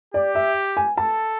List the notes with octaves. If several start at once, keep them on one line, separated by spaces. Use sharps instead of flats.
G4 D5
E5
G#5
A4 A5